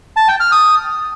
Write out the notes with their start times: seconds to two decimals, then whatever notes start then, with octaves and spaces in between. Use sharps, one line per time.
0.17 A5
0.28 G5
0.40 F6
0.52 D#6